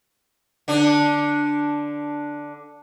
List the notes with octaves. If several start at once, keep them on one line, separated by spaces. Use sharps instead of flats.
D3 D4